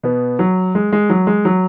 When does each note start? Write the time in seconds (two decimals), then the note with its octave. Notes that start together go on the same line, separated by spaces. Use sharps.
0.03 B2 B3
0.39 F#3
0.75 G#3
0.92 G#3
1.10 F#3
1.27 G#3
1.45 F#3